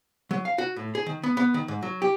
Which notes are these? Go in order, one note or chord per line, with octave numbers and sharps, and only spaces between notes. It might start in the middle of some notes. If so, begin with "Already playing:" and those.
F#3
F5
F#4
A2
G#4
D#3
B3
B3
D#3
G#2
F#3
G4